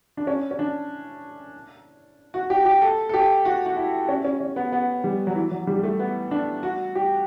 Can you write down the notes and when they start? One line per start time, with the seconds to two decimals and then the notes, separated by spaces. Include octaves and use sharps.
0.17 D4
0.27 C#4
0.51 C#4
0.59 D4
2.34 F#4
2.50 G4
2.65 G4
2.82 A4
3.09 A4
3.14 G4
3.45 F#4
3.66 F#4
3.77 E4
4.09 C#4
4.25 C#4
4.40 C#4
4.56 B3
4.72 B3
5.04 G3
5.27 F#3
5.35 E3
5.51 F#3
5.67 G3
5.79 G3
5.83 A3
5.99 B3
6.31 D4
6.63 F#4
6.95 G4